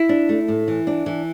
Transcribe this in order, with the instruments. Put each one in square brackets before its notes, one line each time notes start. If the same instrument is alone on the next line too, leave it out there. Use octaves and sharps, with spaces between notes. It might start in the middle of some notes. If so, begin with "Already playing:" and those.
Already playing: [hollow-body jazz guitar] E4
[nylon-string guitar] D4
A3
A2
E3
D4
E3